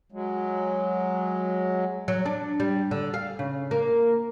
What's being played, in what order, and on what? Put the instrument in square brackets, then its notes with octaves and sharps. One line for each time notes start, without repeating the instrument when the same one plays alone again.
[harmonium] F#3 G#3
[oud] F#3
D4
G3
D3
F5
C#3
A#3